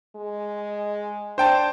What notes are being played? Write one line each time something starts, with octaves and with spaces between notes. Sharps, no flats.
G#3
D4 C5 G5 A5